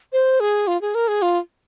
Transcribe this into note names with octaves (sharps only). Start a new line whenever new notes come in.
C5
G#4
F4
G#4
A#4
G#4
F4